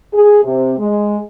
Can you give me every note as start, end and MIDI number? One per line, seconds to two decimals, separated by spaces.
0.14 0.39 68
0.44 0.74 48
0.79 1.18 56